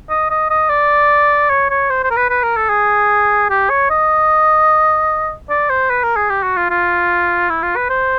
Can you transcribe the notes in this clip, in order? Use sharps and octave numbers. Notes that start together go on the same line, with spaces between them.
D#5
D#5
D#5
D5
C#5
C#5
C5
C5
A#4
B4
B4
A#4
A4
G#4
G4
C#5
D#5
D5
C5
B4
A#4
G#4
G4
F#4
F4
F4
E4
F4
B4
C5